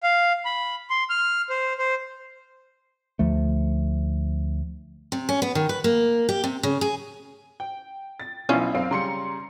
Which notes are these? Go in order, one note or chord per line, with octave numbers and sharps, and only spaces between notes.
F5
B5
C6
F6
C5
C5
D2 F3 A3
C3
C#4
B3
D#3
B4
A#3
G4
C3
C#3
G#4
G5
A6
B1 B2 C#4 D4 E4 F4
F#2 C4 F5
C#3 G3 A#5 C6 C#7